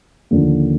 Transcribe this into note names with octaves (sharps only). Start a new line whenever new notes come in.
D#2 D3 F3 A#3